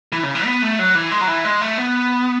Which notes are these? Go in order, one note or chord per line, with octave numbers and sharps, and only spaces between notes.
E3
C#3
E3
B3
A3
F#3
E3
G#3
F#3
E3
G#3
A3
B3